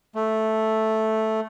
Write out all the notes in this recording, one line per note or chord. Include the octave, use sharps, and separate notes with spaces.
A3